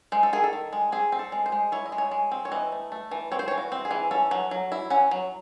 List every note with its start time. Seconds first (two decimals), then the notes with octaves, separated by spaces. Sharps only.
0.12 G#3 C5
0.23 A4
0.33 D#3 G#4
0.44 A4
0.53 D#3
0.73 G#3
0.92 C4 G#4
1.12 C4
1.19 A4
1.32 G#3
1.46 C5
1.52 G#3
1.72 E4 C#5
1.86 D#5
1.92 G#3
1.98 C#5
2.11 G#3
2.32 C4
2.45 C#5
2.52 E3 D#5
2.72 A3
2.92 A3
3.11 E3
3.32 C4 C#5
3.39 C5
3.48 E3 C#5
3.58 F#4
3.72 C4
3.85 G#4
3.91 E3
4.11 C#4 A4
4.31 F#3
4.51 F#3
4.72 E4
4.90 C#4 F#5
5.11 F#3